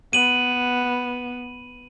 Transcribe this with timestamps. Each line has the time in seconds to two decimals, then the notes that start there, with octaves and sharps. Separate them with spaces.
0.13 B3 D#7 F#7